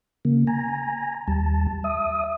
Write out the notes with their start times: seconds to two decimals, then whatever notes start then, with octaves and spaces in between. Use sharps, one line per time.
0.25 C#3 A#3
0.47 G#5 A#5
1.28 D#2 G3 A5
1.84 E5 D#6